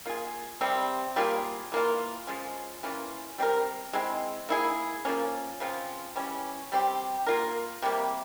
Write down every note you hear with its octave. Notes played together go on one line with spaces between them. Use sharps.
A#3 F4 G#4
C3 G3 C4
G3 A#3 F4 G#4
E3 A#3 F4
F3 G#3 C#4
E3 A#3 C#4 F4
G3 C4 G4 A#4
G#3 C4 E4
A#3 E4 G#4
F3 A#3 C#4
C#3 F3 C4 F4
E3 G3 C#4
G3 C4 G4
A#3 F4 A#4
C3 G3 A#3